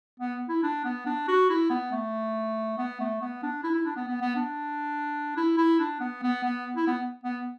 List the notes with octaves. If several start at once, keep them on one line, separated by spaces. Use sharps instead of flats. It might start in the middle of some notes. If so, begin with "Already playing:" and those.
B3
E4
D4
B3
D4
F#4
E4
B3
A3
B3
A3
B3
D4
E4
E4
D4
B3
B3
B3
D4
E4
E4
D4
B3
B3
B3
E4
B3
B3